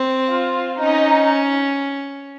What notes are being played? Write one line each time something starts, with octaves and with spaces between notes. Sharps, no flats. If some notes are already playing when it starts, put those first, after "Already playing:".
Already playing: C4
F4
C#4 D#4